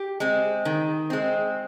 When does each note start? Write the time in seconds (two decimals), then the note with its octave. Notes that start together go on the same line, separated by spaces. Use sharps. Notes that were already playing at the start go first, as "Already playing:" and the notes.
Already playing: G4
0.20 G#3 C4
0.65 D#3
1.10 G#3 C4